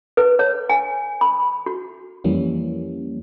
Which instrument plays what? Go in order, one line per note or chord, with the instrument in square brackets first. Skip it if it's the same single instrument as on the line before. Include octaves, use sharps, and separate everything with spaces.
[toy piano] B4
C#5
G#5
B5
F#4
[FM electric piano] F2 E3 G3 A#3 C#4